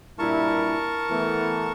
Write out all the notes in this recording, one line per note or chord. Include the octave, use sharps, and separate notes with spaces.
G2 A#2 E4 A#4 A5 C#6
E3 A3 B3